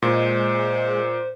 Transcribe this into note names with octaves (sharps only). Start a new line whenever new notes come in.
A#2 G#3 C5